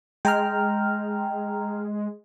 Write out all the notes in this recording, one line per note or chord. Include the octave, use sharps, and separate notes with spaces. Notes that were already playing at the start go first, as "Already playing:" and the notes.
G#3 G5 A#5 F6